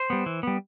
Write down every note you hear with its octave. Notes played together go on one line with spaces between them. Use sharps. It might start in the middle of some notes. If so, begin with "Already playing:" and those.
Already playing: C5
G3 B3
E3
G3 B3